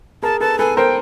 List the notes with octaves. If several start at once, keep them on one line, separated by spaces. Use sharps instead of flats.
G#4 A#4 A5
A4 B4 A5
A4 B4 G#5
A#4 C5 G5